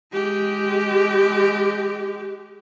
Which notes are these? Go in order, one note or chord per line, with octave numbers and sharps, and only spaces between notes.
G#3 G4